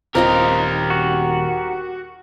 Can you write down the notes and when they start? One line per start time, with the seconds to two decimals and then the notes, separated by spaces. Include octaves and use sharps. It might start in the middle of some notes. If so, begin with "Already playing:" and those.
0.15 D#1 C4 F4 G4 A#4 D#5
0.90 F#4